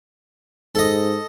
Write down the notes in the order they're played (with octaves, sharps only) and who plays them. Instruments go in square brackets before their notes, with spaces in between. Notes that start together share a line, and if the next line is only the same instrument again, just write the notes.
[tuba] G#2 [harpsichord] A4 D#5